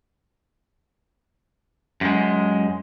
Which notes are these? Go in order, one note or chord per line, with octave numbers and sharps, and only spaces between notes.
F#2 G#3